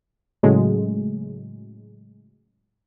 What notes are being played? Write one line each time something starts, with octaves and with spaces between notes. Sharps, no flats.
A2 C#3 F#3 G#3 A3